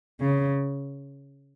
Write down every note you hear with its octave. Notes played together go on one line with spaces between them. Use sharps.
C#3